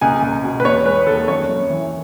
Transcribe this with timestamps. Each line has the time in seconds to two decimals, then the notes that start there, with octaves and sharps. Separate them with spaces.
0.01 C#2 G#5
0.23 C#2
0.43 B2
0.60 B4
0.65 E1 C#5
0.86 G#3 B4
1.06 D#2 A4
1.28 F#2 C#5
1.49 F#2
1.70 E3